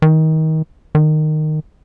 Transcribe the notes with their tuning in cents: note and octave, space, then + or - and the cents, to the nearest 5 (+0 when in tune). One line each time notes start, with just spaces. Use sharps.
D#3 +25
D#3 -15